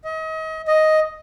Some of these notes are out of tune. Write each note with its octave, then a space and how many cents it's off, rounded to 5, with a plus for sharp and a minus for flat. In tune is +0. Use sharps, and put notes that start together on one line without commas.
D#5 +35
D#5 +5